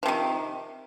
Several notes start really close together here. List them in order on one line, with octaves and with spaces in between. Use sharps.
F3 C3 D#3